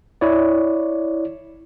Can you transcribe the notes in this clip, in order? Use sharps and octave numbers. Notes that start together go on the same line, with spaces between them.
E4 C#5 D5